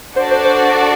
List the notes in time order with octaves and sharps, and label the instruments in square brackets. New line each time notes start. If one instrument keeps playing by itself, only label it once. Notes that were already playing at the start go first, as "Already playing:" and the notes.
[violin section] D4 F#4 A4 D5 F#5 [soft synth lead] C5
[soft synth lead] C5
C5